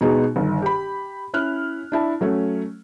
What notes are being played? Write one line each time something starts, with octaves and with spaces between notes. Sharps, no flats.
B2 G#3 B3 D#4 F#4 G#4
G1 D#3
G4 B5
C#4 E4 F6 F#6
D4 E4 A5
F#3 A3 C#4